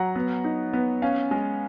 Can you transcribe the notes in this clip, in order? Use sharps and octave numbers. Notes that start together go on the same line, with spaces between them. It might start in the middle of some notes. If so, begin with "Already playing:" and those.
Already playing: F#3 F#5 A#5
B3
D#4
B3
C#4 F5 G#5
G#3